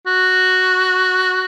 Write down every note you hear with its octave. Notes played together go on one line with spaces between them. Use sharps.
F#4